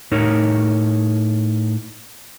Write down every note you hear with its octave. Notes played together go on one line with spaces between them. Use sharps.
A2 D#4 A#4 C#5